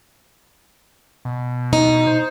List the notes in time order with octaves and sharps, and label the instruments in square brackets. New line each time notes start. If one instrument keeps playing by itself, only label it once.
[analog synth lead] B2
[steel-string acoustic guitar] D#4
[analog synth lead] C5